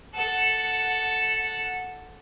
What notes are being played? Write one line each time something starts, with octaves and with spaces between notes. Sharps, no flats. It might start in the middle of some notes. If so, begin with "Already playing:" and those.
A4 F#5